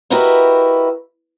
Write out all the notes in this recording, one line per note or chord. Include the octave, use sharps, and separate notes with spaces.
E4 F#4 G4 A#4 B4 D#5